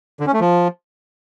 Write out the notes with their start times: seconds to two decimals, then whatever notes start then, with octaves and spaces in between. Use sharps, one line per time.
0.20 D3
0.27 C#4
0.33 A3
0.40 F3